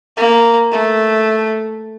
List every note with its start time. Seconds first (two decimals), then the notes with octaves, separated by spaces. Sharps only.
0.17 A#3
0.72 A3